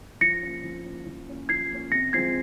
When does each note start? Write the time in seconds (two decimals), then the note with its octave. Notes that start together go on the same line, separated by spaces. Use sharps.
0.21 F3 A#6 C#7
0.42 A#3 C#4
0.64 F3
0.85 A#3 C#4
1.06 F3
1.28 A#3 C#4
1.49 F3 G#6 C7
1.71 A#3 C#4
1.92 C3 A#6 C#7
2.13 F3 G#3 C4 F4 G#6 C7